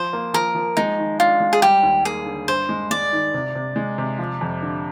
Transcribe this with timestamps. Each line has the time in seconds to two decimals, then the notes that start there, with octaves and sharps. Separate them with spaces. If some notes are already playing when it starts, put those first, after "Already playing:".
Already playing: F3 C5
0.13 A#3
0.34 F3 A#4
0.55 F3
0.77 G#3 D#4
0.99 D#3
1.20 D4 F4
1.40 G#3
1.53 G#4
1.62 G3 G4
1.83 D#2
2.05 A#3 G#4
2.26 D3
2.48 G2 C5
2.69 G#3
2.91 G#3 D5
3.13 D#3
3.34 C3
3.55 C3
3.76 G#3
3.98 C3
4.19 F3
4.41 F2
4.62 D3